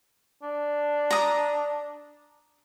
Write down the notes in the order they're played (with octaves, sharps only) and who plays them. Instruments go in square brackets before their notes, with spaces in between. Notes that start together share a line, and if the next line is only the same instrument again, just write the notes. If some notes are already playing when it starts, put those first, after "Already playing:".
[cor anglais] D4
[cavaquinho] A#5 D#6